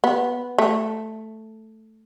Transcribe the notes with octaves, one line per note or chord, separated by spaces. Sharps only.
B3
A3